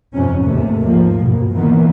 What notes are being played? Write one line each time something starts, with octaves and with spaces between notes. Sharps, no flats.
F2 G#2 C3 C#4
D#2 C3 A3
G#2 F3 A#3
G2 B2
D#3 E3 A#3 B3